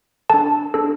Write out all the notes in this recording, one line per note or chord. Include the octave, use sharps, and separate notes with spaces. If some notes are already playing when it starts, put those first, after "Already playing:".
D4 A4 A5
D4 A4